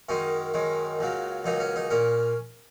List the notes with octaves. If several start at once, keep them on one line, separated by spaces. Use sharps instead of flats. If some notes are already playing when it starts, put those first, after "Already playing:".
F#2 D#3 G#3 C#4
F#2 D#3 G#3
C#2 C#3 F#3 A#3
C#2 C#3 F#3 A#3 D#4
C#4
D#4
A#2 A#3 C#4